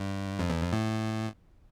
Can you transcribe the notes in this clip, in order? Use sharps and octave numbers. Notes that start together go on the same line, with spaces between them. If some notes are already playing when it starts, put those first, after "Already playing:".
Already playing: G2
F2
E2
F2
A2